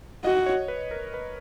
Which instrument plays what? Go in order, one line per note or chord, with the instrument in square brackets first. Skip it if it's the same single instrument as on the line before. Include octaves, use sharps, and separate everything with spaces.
[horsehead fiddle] F#4 [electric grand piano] D#5
[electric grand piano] C#5
B4
A#4
B4